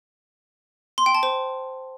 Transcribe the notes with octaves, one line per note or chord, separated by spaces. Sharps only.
C6
G5
A5
C5